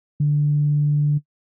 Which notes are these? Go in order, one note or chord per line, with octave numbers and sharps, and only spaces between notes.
D3